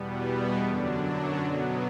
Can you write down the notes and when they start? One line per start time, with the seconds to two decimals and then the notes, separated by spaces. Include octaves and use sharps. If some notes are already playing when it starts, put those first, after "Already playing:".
Already playing: E2 B2 G3 B3
0.56 F#2 D3 F#3 D4
0.98 D4
1.38 B2 F#3 B3